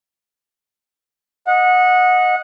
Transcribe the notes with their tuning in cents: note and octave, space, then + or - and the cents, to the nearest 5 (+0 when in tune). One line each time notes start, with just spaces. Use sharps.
D#5 +0 F#5 -20